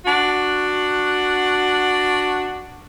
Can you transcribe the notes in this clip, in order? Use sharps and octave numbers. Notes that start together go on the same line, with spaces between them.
D4 F#4